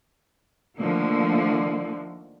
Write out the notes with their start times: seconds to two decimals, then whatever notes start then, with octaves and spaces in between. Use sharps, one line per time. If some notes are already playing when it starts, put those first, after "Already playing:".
0.78 D3 D#3 F3 A3 A#3